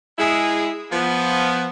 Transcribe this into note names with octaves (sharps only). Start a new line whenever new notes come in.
G#3 E4 G#4
F3 B3